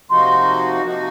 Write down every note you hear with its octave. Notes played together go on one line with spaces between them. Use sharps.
C3 F3 A#3 D#4 F#4 C6
C3 F3 A#3 D#4 F#4